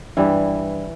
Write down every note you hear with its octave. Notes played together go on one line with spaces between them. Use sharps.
G2 E3 G3 E4